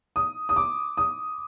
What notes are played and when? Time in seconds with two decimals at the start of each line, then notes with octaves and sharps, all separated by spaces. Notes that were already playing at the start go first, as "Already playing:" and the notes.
0.16 D#6
0.49 D#6
0.56 D6
0.97 D#6